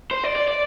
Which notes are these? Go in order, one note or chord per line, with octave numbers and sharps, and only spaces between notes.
C5
D5
D5
D5